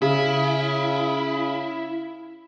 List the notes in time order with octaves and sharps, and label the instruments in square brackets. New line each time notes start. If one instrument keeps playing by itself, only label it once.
[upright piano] C#3 [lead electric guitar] E4